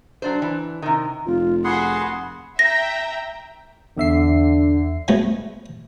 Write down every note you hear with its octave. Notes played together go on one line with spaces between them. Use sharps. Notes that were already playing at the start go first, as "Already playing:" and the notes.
F#3 D4 C5
E3
C3 D#3
F1 F4
A#3 B3 F#4 G#4 F#5 B5 C6
E5 G5 A#5 A#6
E2 D3 E5 C7
F3 F#3 G#3 A3 B3